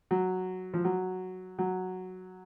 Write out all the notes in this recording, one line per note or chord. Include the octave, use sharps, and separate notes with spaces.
F#3
F3
F#3
F#3